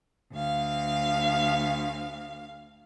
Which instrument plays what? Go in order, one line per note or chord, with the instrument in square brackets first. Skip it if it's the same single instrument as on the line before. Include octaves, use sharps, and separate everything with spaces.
[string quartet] D2 F5